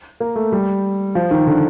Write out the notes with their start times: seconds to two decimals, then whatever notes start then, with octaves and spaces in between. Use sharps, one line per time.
0.20 A#3
0.36 A3
0.52 G3
1.15 F3
1.31 D#3
1.47 D3